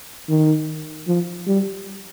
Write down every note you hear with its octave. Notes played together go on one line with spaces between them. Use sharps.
D#3
F3
G3